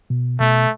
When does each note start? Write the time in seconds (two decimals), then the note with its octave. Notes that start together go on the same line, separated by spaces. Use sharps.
0.10 B2
0.40 B2 A3